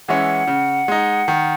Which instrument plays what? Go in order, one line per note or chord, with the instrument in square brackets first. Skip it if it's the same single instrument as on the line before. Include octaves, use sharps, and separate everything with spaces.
[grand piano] E3 G#3 C#4 E4 [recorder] F#5
[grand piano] C#3
G#3 D#4
D#3